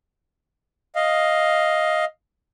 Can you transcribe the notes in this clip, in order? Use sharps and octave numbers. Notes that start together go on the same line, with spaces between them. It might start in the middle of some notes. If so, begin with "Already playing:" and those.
D#5 F5